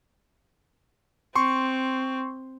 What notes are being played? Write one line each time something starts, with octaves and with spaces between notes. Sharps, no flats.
C4 C6 C#6